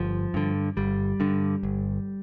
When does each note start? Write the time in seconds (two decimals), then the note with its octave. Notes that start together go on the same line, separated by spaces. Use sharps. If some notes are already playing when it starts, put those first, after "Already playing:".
Already playing: G1 F3
0.34 G2 D3
0.77 G1 G3
1.20 G2 D3
1.63 G1